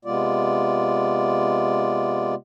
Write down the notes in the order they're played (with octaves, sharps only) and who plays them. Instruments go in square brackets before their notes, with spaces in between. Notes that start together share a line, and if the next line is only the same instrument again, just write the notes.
[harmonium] C3 G#3 B3 F4 D5